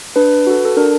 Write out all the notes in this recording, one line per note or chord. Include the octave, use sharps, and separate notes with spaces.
D4 B4
F#4 A4
A4
D4 A#4